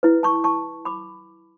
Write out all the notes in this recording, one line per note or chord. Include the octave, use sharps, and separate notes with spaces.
E4 B4
A5 C#6
A5 C#6
B5 D6